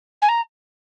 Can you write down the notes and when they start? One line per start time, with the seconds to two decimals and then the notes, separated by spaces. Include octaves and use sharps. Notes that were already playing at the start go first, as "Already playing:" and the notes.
0.22 G#5
0.28 A#5